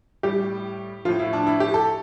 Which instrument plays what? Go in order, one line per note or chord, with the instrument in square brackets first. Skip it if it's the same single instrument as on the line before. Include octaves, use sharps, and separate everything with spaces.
[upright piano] A2 G3 G4
A2 F3 F4
E4
D4
E4
G4
A4